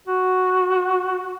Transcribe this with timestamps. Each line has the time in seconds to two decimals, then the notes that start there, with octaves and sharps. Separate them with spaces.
0.07 F#4